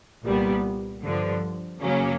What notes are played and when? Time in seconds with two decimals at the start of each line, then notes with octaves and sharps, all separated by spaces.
0.24 C2 A#2 G3 B3
1.03 G2 D3 F3
1.81 F#2 C#3 F#3 A#3 C#4